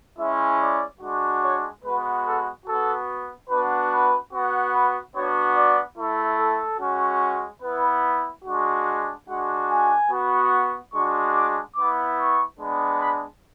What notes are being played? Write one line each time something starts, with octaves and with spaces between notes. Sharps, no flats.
G#3 C#4 E4 E5
D5
G#3 D4 F#4
C#5
G#3 B3 F#4 B4
A4
B3 F#4 A4
B3 D4 F#4 B4
B4
B3 F#4
B4
B3 D4 F#4 C#5
D5
A3 E4
A4
G#3 C#4 F#4
B3 E4 B4
G#3 D4 F#4
G#3 D4 F#4 F#5
G#5
B3 F#4
G#3 D4 F#4 C#6
D6
B3 E4 D6
C#6
G#3 B3 D4
B5